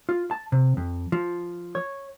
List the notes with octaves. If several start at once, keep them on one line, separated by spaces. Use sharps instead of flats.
F4
A5
C3
F2
F3
C#5